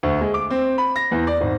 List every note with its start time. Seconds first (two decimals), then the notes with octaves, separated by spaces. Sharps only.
0.03 D2
0.21 G#3
0.34 D6
0.50 C4
0.78 B5
0.96 A#6
1.11 E2
1.27 D5
1.41 G#1